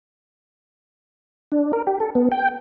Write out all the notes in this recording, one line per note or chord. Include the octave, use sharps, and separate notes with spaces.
D4
A#4
G4
A4
B3
G5